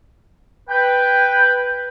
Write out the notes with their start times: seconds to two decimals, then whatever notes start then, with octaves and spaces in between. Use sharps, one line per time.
0.70 B4 G5